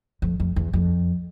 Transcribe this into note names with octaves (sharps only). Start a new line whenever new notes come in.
F2
F2
E2
F2